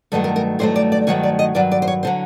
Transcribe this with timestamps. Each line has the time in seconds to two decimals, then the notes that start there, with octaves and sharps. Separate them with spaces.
0.12 G2 D#3 F#3 A3 A4
0.24 A#4
0.36 A#4
0.59 G2 D#3 F#3 A3 C5
0.76 D5
0.92 D5
1.07 G2 D#3 F#3 A3 C#5
1.23 D5
1.39 D#5
1.55 G2 D#3 F#3 D5
1.72 D5
1.82 C5
1.88 C#5
2.03 D3 F#3 C5